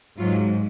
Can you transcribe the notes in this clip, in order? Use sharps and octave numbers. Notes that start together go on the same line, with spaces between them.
G#2 F#3 F4